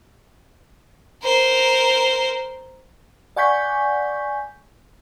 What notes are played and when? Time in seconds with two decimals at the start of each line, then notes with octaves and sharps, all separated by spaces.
1.23 A#4 C5
3.36 D5 F#5 G#5 C#6 G6 B6